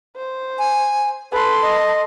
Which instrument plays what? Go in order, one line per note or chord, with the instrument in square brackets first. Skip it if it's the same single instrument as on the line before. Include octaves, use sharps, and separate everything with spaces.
[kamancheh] C5
[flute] G#5
[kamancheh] A4 C6 [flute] B4
[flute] D#5